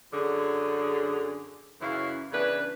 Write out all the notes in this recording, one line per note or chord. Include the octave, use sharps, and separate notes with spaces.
F#2 D3 G#4
F#2 C#3 E3 E4 F5
C#3 E3 D4 B4